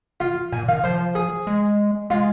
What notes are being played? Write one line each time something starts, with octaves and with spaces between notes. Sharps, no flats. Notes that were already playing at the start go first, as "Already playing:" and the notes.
F4
A#2 G#5
D#3 F5
F3 C5
G#4
G#3
G#3 F4